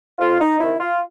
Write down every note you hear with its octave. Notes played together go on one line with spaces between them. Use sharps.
F2 F4
D#4
C3 D#3 E4
F4